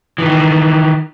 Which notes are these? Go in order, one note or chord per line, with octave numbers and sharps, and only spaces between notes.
D#3 E3